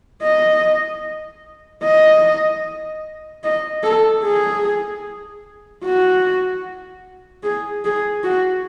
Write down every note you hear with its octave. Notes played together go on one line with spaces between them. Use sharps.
D#5
D#5
D#5
A4
G#4
F#4
G#4
G#4
F#4